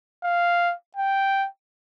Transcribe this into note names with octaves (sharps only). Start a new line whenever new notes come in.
F5
G5